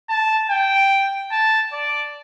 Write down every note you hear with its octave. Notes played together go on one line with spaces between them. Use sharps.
A5
G5
A5
D5